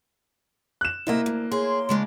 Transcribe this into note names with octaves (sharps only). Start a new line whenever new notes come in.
F#6 E7
C3 A#3 E4 D#5 E5
D2
G#4 C#5 C6
C#3 G#3 D4